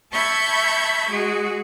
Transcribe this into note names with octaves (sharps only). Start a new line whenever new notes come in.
E5 A5 B5 C#6 G6 G#6
G#3 F#4 G#4